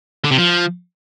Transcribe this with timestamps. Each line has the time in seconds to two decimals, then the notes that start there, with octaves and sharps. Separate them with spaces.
0.24 D3
0.31 C3
0.38 F3